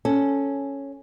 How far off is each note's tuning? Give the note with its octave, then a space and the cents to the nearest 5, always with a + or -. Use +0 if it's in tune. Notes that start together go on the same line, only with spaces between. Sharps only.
C#4 +0 A4 +0